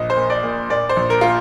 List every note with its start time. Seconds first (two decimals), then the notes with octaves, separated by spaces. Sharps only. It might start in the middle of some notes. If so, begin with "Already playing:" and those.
Already playing: A#1 D#5
0.10 C5
0.16 A#2
0.30 D5
0.43 A#2
0.70 A#2 D5
0.89 C5
0.97 A#1
1.10 A#4
1.21 A#2 F4